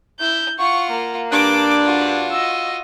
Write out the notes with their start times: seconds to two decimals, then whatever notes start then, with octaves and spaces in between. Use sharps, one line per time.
0.20 E4 G6
0.59 F4 F#5 C#6
0.91 A#3
1.32 G2 D4 D6
1.84 F4 F#4
2.32 D#5 E6